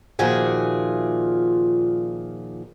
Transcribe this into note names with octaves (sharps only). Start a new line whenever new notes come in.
A#2 D#3 F3 F#4 G#4 E5